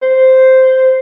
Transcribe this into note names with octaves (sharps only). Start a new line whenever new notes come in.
C5